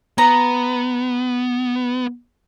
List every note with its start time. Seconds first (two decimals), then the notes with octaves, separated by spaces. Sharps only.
0.18 B3 A#5